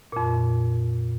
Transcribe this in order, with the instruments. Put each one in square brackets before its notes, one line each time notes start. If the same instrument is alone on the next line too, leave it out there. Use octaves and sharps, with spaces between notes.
[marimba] F2 A#2